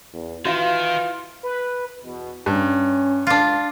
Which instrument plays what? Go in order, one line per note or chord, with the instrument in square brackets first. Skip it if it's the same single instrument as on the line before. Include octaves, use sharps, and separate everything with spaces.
[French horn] E2
[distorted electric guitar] D#3 [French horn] E3 [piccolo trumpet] F4 [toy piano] F#4 E5 F5
[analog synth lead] B4
[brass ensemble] E2 B2
[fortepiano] G2 [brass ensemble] C#4
[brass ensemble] C#2 D3 [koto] D4 F4